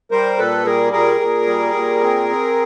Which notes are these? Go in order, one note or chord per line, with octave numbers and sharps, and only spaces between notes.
G3 A#4 C5
A#2 A4 B4
G3 G#4 A#4
A#2 G#4 A#4
A#2
G3
A#2
C4
C4